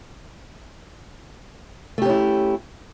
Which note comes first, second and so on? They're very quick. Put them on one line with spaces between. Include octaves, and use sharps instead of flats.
A3 G4 C#4 E4